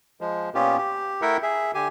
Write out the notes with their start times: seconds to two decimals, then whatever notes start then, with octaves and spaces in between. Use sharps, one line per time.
0.21 F3 G#3
0.55 A#2 B3 C#4 F4 G4
0.78 G4
1.22 A3 E4 A#4 E5 F#5 G5
1.43 G#4 E5
1.75 D3 G4 G#5